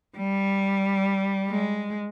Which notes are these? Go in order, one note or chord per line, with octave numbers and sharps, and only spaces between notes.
G3
G#3